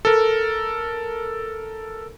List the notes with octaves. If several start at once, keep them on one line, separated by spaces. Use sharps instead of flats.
A4 A#4